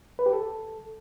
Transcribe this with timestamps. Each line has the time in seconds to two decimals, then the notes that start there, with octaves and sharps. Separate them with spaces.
0.19 B4
0.26 G4
0.33 A4